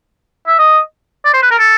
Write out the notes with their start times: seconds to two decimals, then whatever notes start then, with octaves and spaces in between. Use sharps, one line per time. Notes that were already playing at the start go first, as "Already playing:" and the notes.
0.47 E5
0.59 D#5
1.25 D5
1.34 C5
1.42 B4
1.51 A#4
1.59 A4